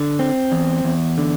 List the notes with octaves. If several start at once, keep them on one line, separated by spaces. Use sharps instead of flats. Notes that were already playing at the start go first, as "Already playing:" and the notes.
Already playing: D3
C4
E2
E2
D3